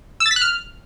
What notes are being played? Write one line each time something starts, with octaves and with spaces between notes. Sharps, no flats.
E6
A6
B6
F#6
F6